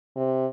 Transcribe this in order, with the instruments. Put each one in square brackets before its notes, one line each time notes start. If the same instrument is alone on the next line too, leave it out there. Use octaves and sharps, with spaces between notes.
[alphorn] C3